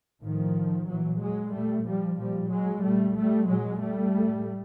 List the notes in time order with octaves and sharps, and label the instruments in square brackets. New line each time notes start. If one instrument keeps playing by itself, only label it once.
[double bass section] A2 D#3 F3
A#2 E3 F#3
F#3 G#3
A#2 G3 A3
F3 G3
A#2 F3 G3
F#3 G#3
A#2 G3 A3
G3 A3
A#2 F#3 G#3
G3 A3
A2